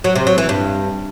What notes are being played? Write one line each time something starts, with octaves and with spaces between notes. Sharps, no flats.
F#3
C3
F#3
E3
G2